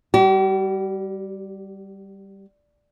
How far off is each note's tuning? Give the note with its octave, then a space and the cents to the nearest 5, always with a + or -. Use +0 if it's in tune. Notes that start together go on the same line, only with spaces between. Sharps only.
G3 +0 G4 -45